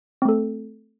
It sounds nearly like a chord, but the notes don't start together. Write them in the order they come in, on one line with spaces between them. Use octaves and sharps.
C4 A3 A4